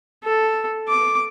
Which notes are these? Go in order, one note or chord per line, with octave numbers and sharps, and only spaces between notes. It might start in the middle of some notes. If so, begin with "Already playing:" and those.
A4
D6